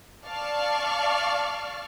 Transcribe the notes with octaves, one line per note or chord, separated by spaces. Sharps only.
D5 F5 A5 C#6 F6